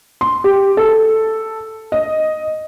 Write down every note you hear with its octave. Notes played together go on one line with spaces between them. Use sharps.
C6
G4
A4
D#5